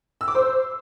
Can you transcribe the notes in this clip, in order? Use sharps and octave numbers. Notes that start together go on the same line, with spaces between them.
E6
D6
C5